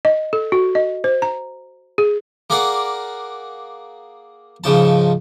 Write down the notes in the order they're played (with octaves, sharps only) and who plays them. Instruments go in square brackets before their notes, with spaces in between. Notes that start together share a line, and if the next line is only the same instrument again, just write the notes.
[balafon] D#5
A4
F#4
D#5
C5
A#5
G#4
[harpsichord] A#3 G#4 A#4 D5 F#5
G#2 C#3 F3 A5